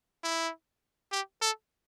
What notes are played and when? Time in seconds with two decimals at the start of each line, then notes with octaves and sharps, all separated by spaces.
0.24 E4
1.12 G4
1.41 A4